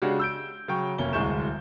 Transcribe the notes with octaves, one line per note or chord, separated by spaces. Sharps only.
C#3 G#3 D4 F#4 G4
E6 G6 D7
C#3 F#3 G5 C#6
F1 A#3 C#4 G7
D1 C2 G#3 C#6 G6 E7